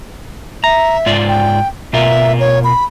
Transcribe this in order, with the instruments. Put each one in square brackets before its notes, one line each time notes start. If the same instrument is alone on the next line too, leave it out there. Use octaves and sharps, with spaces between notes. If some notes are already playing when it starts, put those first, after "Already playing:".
[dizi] E5 [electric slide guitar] A#5
[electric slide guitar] G#2 F4 D5
[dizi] G5
[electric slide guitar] B2 F4 A#4 [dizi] E5
[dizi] C#5
B5